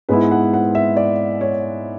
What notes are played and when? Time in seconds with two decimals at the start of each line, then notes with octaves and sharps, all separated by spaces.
0.09 G#2 G#3 B3 E4 B4
0.31 F#5
0.53 F#5
0.75 E5
0.97 D5
1.41 C#5